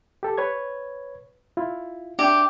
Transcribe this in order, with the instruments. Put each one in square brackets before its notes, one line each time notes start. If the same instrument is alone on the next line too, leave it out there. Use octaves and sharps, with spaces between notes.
[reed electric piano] G4 A4
B4 C#5 G#6
E4 F4
[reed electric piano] D4 E5 [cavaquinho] G4